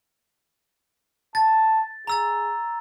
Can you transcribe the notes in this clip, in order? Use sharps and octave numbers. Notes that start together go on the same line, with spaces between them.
A5 A6
G#4 A#5 E6 A6